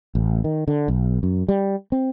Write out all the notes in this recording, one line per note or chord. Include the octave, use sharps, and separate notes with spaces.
A1
D#3
D3
B1
F#2
G3
C4